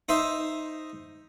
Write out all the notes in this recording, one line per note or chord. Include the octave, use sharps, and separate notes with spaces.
D#4 C5 E5